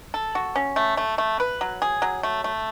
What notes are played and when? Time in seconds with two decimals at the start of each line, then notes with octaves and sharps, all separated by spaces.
0.14 A4
0.35 F#4
0.56 C#4
0.76 A3
0.97 A3
1.18 A3
1.40 B4
1.61 F#3
1.82 G#4
2.02 F#3
2.23 A3
2.44 A3